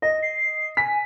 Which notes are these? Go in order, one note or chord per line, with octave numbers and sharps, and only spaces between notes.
D#5 A#6
C7
G#5 B6